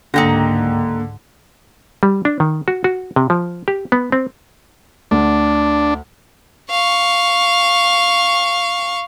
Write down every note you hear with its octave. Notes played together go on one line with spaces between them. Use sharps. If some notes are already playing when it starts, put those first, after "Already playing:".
C#2 G#2 D3 A#3 D#4 G4 A#5
G3
D4
D#3
F#4
F#4
C3
F3
G4
B3
C4
D2 D4
F5 C#6